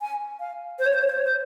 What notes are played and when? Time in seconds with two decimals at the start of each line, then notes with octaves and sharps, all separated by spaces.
0.01 G#5
0.40 F5
0.79 C5
0.86 C#5
0.93 C5
1.02 C#5
1.10 C5
1.17 C#5
1.24 C5